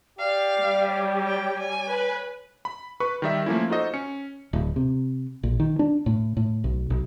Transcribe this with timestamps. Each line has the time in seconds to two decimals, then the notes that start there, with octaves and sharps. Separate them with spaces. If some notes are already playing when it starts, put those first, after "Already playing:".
0.19 G4 D5 F5
0.59 G3
0.88 C#5
1.27 G5
1.59 G#5
1.91 B4
2.65 B5
3.00 B4 B5 C#6
3.22 D#3 G3 E5
3.46 F3 A3 A#3 C#4 E4
3.70 D#4 F4 F#4 A4 C5 D#5
3.94 C#4 C#7
4.53 D1
4.76 C3
5.43 A#1
5.60 D#3
5.79 D4
6.06 A2
6.37 A2
6.64 B1
6.90 B1